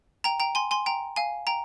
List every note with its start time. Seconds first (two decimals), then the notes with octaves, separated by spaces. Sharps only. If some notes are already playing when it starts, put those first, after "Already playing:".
0.24 G5 A#5
0.40 G5 A#5
0.55 G#5 C6
0.71 G#5 C6
0.86 G5 A#5
1.16 F5 G#5
1.47 G5 A#5